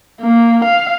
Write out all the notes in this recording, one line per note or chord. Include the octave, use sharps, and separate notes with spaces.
A#3
F5